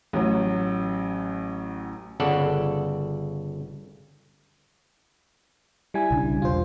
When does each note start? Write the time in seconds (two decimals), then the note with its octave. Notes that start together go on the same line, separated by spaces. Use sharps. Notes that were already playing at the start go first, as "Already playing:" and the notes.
0.13 A1 F#3
2.20 G1 C#3 A4 D5 F#5
5.94 G3 E4 G#5
6.11 B1 C#3 D4
6.42 E1 F4 C5